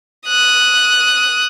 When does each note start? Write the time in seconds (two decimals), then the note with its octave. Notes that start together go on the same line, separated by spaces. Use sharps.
0.27 D#6 F#6